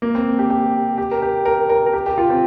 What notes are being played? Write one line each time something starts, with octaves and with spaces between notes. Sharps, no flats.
A#3
C4
G4
G4
G4
A#4
G4
A#4
A#4
A#4
G4
G4
F4
C4